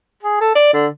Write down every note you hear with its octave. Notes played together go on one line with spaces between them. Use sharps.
G#4
A4
D5
D3